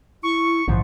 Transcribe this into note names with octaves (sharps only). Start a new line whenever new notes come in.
E4 C#6
A#1 G#2 E3 F3